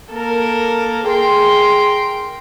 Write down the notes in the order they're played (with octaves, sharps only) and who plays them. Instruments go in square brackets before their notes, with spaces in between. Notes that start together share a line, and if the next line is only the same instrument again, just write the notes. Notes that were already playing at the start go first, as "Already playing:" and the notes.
[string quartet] A#3 A4 A#4
[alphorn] G#4 [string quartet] A#4 G5 C6